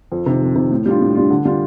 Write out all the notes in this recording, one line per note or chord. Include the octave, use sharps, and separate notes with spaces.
F2
C3 D#3
F2
C3 D#3
A2
G3 D4 F4
A2
G3 D4 F4
D3
G3 D4 F4